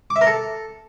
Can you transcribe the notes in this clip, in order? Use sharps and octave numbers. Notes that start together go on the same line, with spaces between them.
D6
E5
A#4
A4